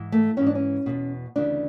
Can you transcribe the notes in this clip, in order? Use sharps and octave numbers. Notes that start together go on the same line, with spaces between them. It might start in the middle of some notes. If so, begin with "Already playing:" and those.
Already playing: G#2 E3
A3
G#2 E3 C#4
D4
C#4
E2 B2
D2 C#3 E3 D4